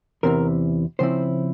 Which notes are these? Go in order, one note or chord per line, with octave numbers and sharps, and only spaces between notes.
E2 C3 E3 A#4
C#3 F3 C4 E4 C5